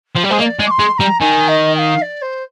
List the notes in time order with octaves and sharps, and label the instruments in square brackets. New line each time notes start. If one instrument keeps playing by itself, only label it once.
[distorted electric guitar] F3
G3
[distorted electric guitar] G#3 [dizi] C5
[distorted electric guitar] A#3 [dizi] D#5
[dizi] D5
[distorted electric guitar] G#3
[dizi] D6
C6
[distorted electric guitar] G#3
[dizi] C6
[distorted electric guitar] G3 [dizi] A#5
[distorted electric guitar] D#3 [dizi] G#5
[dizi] D#5
G5
F5
D5
C5